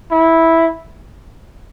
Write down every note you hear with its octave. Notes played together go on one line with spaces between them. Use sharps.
E4